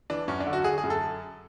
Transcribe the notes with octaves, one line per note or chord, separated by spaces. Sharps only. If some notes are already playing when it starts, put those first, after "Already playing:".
E3 D4
F#2 C#4
D4
D3
F#4
D3 G#4
G#4
F#2
A4